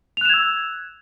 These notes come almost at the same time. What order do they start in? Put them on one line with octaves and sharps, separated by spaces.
F7 F#6 E7 G#6 E6